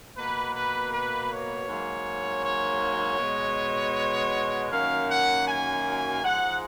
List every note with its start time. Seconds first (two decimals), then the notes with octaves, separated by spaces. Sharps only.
0.16 B2 A#3 B4
0.54 B4
0.91 B4
1.30 C#5
1.68 G#2 F#3 A#3
2.44 C#5
3.19 B2 G#3
4.71 F#2 D#3 F#3 A#3 F5
5.08 F#5
5.47 G#5
6.23 G#2 F3 G#3 F#5